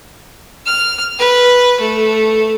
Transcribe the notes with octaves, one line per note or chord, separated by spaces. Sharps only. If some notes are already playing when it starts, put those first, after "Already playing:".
F6
B4
A3